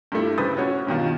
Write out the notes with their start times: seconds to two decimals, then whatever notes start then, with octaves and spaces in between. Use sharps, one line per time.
0.12 G2 G3 A3 E4
0.38 G2 C#3 B4 C5 D#6 A6
0.57 C#4 F#4 C#5
0.87 G2 B2 D#3 F4